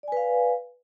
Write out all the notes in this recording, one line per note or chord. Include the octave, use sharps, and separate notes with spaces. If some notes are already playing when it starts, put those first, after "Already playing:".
B4 D5 F5 G#5